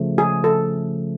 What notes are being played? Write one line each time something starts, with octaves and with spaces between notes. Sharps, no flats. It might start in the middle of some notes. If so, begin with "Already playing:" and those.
Already playing: C#3 F3 A3
G#4
A4